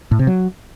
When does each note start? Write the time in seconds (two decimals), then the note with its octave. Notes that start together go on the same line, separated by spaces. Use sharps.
0.11 A2
0.19 C3
0.27 F#3